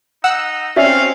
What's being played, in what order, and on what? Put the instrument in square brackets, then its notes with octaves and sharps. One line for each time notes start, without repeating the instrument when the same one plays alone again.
[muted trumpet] D#4 [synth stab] F#5 E6
[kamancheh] C4 C#4 [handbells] F#4 D5 E5 [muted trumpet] F5